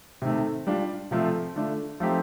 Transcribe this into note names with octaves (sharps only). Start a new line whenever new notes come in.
C3 D#3 A3
G3 D4 F4
C3 F3 A3 C4 F4
D3 A3 D4 F4
F3 A3 C4 D#4 G4